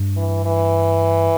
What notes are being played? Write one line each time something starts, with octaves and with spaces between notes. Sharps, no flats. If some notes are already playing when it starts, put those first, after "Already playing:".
Already playing: G2
E3
E3